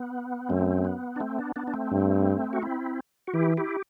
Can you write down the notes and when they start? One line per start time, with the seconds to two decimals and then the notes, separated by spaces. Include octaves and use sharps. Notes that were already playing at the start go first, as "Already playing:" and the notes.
Already playing: B3
0.49 F#2 A3 C4
0.78 A3
0.85 B3
1.16 D4
1.20 A3 C4
1.39 B3 D4
1.56 B3 D4
1.67 D4
1.74 A3 C4
1.91 G2
2.53 F#4
2.62 C4 E4
3.27 F#4
3.34 E3 E4 G4
3.57 E4 G4